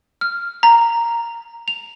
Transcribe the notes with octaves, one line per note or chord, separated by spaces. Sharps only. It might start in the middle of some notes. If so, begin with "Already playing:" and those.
F6
A#5
F7